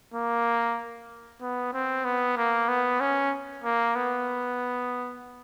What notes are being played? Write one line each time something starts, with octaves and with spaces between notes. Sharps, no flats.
A#3
B3
C4
B3
A#3
B3
C#4
A#3
B3